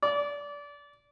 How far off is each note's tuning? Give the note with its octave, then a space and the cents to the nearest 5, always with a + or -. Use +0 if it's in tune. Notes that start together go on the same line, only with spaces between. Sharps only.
D5 -25